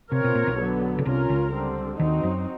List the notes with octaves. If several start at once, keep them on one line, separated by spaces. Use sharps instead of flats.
C3 C4 F4 A#4 C#5
B2
A#2
B1 B2
D3 F#3 B3
C#3
C2 C3 C#4 F4 A#4
C#2 C#3
D3 G3 C4
D#2 D#3 C4 D#4 F#4
F#2 F#3